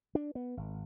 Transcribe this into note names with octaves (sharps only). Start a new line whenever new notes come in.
D4
B3
G#1